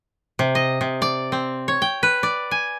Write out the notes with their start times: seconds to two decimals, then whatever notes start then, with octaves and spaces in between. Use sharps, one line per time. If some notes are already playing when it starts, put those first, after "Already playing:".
0.39 C3
0.55 D#5
0.81 C3
1.02 D5
1.32 C4
1.68 C#5
1.82 G5
2.03 B4
2.23 D5
2.51 G#5